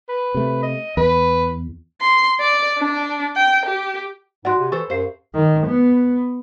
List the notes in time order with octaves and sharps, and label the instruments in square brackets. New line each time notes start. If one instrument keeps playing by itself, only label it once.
[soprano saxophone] B4
[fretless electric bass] C3 A3
[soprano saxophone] D#5
[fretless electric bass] E2 [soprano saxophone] B4
[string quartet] C6
D5
D4
G5
G4
[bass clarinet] G#2 [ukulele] F#4 D5 [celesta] F#5 C6 F#6
[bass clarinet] C3
[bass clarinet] E3 [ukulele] A4 C5 [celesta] C#6
[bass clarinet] F#2 [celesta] G4 F5 C7 [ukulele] C5
[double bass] D#3
B3